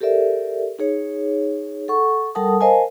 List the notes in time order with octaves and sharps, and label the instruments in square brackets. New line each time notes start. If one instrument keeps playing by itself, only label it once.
[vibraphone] G4 A4 A#4 D5 E5
D#4 G#4 C#5
A4 F#5 C#6
G3 A4 A#4 F#5 A5 D#6
A#4 C5 D#5 F5 G#5 A5